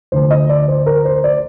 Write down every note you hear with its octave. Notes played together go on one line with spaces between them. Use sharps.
D2 D3 F3 C5
D#5
D5
C5
A#4
C5
D5